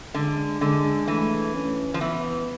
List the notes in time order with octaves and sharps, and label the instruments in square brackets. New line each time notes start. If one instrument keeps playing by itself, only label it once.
[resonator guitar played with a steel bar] D3 [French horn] G#3
[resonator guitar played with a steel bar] D3 [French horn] G#3
[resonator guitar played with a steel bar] E3 [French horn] A3
[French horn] C#4
[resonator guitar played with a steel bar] F3
[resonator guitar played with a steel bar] E3 [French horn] B3